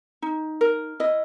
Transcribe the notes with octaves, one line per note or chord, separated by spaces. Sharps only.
D#4
A#4
E4 D#5